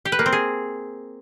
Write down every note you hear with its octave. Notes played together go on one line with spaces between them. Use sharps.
G4
B4
A#3
C4
G#4